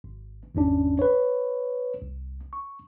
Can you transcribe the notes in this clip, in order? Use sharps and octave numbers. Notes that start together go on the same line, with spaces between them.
G#1
G#1 E2 C#4 D4
B4 C#5
C2
C#6